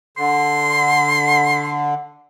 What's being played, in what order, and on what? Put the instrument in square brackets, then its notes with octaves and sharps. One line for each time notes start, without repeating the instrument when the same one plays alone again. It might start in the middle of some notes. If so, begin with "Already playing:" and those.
[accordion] D3 [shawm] C6